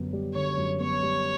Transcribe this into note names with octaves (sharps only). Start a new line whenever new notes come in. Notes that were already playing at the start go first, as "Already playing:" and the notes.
Already playing: F#2 D3 G3 B3
G3
D3 C#5
F#2
B3 C#5
G3